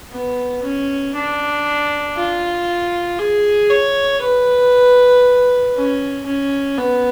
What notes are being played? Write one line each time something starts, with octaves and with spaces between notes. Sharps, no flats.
B3
C#4
D4
F4
G#4
C#5
B4
C#4
C#4
B3